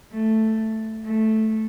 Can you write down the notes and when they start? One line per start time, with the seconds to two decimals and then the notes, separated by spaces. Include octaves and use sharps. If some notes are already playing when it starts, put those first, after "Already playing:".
0.12 A3
1.05 A3